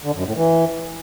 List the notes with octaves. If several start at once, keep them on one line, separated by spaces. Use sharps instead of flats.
D3
F#2
A2
E3